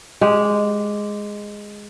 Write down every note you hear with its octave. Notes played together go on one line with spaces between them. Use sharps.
G#3 G4